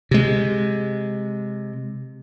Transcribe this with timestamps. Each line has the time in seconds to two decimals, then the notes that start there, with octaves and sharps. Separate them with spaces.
0.11 C3 G#3